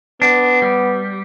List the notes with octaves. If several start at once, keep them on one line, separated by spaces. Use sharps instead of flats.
B3 D4
G3